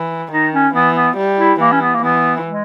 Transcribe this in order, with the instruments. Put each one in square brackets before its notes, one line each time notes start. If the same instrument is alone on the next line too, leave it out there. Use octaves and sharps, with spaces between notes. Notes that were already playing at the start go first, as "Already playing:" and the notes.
Already playing: [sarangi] E3
[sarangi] D#3 [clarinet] D#4
[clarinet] C#4
[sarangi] E3 [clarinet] B3
[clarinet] B3
[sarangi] G3
[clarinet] E4
[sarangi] E3 [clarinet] A#3
[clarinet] C#4
B3
A#3
[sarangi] E3 [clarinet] B3
[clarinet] G#3